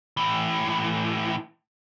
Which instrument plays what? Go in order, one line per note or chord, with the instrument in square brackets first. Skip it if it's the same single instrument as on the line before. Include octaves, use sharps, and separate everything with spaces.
[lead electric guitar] A2 E3